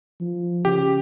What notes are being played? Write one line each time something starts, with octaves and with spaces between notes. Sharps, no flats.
F3
C#3 G4